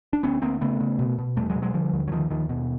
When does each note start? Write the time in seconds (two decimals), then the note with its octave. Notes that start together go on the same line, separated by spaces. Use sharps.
0.13 D4
0.23 D2 B3 C#4
0.42 D2 A#3 C4
0.61 C#3 A3 B3
0.80 C#3
0.99 B2
1.18 B2
1.36 E2 G3 A3
1.50 F#3 G#3
1.55 B2
1.62 F#3 G#3
1.74 D3 F3 G3
1.93 D#2
2.07 F#3
2.11 D#2 D#3 F3
2.30 D#2 D#3 F3
2.49 B2